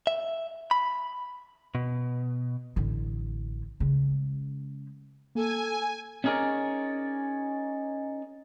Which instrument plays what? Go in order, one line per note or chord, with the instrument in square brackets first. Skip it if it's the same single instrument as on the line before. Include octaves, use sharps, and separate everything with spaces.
[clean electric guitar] E5
B5
B2
[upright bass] A1 D3
C#3 G#3
[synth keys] A#3 [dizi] A4 [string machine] G#5
[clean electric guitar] C#4 D#4 G#4 A#4 C#5 D5